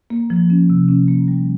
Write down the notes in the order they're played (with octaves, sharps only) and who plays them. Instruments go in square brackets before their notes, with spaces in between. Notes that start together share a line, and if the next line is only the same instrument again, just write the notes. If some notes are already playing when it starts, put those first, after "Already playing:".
[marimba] A#3
F3
C#4
C3
C#4
A#3
G3